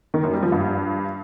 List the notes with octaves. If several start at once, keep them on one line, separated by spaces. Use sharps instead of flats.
D#3
F#2
G3
F3
G2